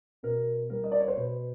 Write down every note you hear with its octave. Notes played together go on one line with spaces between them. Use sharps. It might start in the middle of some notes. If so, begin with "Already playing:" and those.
B2 A#4
G3 A#4
D#5
D5
C#5
C5
B2 B4